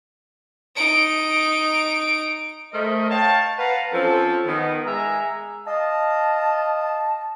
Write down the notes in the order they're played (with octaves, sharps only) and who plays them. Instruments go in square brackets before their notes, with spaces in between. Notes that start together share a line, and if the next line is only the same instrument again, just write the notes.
[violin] D#4 D7
[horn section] A3 A#4 C5 D#5
C#5 F5 G5 A5
B4 F5 F#5 A5 A#5
F3 C4 C#4 A4
D#3 B3
G#3 E5 G#5 A#5
[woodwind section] D#5 F5 A5